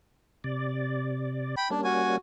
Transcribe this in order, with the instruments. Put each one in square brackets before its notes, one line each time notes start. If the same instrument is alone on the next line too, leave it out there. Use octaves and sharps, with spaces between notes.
[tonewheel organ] C3 D5
[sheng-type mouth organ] G5 B5
[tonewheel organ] G3 A#3 C#4 [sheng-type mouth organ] D4
[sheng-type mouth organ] F#4 G#5